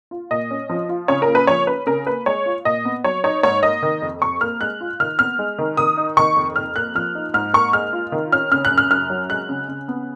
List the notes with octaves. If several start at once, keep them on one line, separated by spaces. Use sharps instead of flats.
F4
A#2 D#5
C#4
F3
F4
C#3 C#5
A#4
A#3
B4
F3 C#5
C#4 B4
C#3 A#4
A#3 B4
G#3 C#5
F4
A#2 D#5
B3
F#3 C#5
D#4 C#5
G#2 C#5
A#3 D#5
D#3
F2
F2 C#6
A#3 F6
G#3 F#6
F4
D#3 F6
B3 F6
G#3
D#3
D#3 D#6
D#4
D#3 C#6
F2
F2 F6
A#3 F#6
F3 F6
D#4
G#2 F6
A#3 C#6
G#3 F6
F4
D#3
C#4 F6
C#3 F6
F#6
F#2
F6
F#2 F6
F#3
G#3 F#6
C#3
C#3
B3